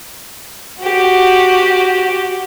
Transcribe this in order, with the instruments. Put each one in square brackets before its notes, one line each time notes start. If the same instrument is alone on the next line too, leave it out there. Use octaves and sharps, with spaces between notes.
[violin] F#4 G4